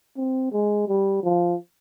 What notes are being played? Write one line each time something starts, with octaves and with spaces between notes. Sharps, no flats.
C4
G#3
G3
F3